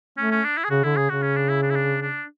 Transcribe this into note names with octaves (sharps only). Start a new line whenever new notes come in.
A3 C#4
C#4
D4
E4
G#4
C#3 F#4
D3 E4
C#3 G#4
C#3 F#4
C#4
D4
E4
D4
E4
D4
D4